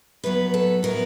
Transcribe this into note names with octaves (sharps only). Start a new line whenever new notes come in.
A2 F#3 B3 B4
A4
A2 F#3 B3 A#4